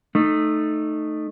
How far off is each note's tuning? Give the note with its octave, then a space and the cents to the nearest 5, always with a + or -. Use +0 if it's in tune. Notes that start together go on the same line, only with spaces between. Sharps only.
A3 +0 D#4 -15